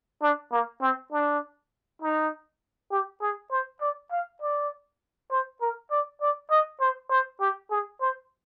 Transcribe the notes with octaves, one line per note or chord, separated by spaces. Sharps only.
D4
A#3
C4
D4
D#4
G4
G#4
C5
D5
F5
D5
C5
A#4
D5
D5
D#5
C5
C5
G4
G#4
C5